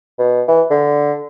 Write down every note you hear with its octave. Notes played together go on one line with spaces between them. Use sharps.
B2
E3
D3